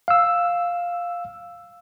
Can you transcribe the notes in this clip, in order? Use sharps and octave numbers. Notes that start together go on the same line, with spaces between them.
F5 E6